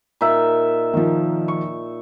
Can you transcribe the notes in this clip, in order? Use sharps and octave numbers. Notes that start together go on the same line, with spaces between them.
A#2 D#4 E5
D#3 F3
C#6